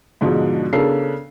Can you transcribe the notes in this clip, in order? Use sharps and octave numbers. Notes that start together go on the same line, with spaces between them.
G#2 B2 D3 F3 G#3 D4
C#3 B3 D4 A4 A#4 C7